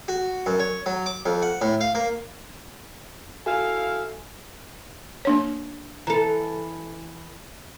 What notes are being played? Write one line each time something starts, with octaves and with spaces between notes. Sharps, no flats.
F#4
F#2
C#5
F#3
D6
F2
F#5
A2
F5
A#3
E4 F#4 A4 E5 F5 G#5
A#3 D4 C#5
E3 A4 A#5